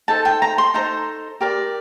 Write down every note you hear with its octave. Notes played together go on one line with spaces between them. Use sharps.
D#4 A4 C5 A5
G5
A#5
C6
D#4 A4 C5 A#5
G4 A#4 D5